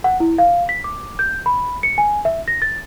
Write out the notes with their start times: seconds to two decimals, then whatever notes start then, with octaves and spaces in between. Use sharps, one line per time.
0.04 F#5
0.20 E4
0.38 F5
0.69 B6
0.84 D6
1.19 G6
1.46 B5
1.83 C#7
1.98 G#5
2.25 E5
2.48 A#6
2.62 A6